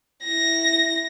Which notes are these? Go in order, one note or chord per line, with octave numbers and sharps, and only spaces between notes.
E4 A#6